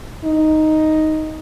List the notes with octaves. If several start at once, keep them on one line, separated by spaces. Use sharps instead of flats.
D#4